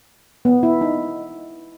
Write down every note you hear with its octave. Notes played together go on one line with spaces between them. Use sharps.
B3
E4
D#4